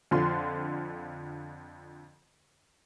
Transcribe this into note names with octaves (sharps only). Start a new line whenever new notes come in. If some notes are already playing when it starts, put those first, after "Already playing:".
F2 D3 F4 C6